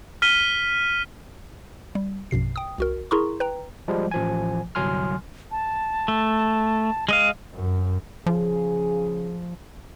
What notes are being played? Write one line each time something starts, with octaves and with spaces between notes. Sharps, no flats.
F6 B6 D#7 G7
G3
A#1 F#2 B2 C7
G5 D#6
C2 F#4 A#4
E4 G#4 A#4 A#5 C6 C#6
B4 G5 A#5
F3 G3 G#3
A1 F3 G#5
G1 C2 F#3 G#5 C6 F6
A5
A3
G#3 D#5 F5 D#7
F#2
C#3 F3 G#4